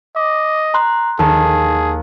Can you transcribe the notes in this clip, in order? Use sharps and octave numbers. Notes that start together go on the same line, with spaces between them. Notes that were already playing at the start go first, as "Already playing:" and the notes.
D#5 D6
A#5 C6 F#6
D#2 G#4 A5